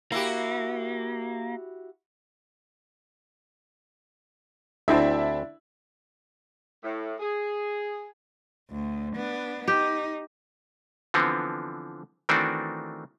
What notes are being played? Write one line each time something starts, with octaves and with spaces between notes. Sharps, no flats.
A#3 E4 F#4 G4
D2 C4 D4 E4 E5
A2
G#4
D2
B3 D4
D#4 G4
D3 E3 F3 B3 C4
D#3 E3 A3 C4 D4 F#4